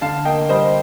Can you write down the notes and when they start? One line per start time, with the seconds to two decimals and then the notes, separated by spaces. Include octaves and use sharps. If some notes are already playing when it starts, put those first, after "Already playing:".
0.01 D3 F5 A5
0.25 A#3 D#5 G5
0.49 G3 C5 D#5